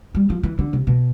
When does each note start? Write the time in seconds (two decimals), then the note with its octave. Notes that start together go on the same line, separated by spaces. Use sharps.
0.15 G3
0.30 F3
0.43 E3
0.59 D3
0.73 C3
0.87 B2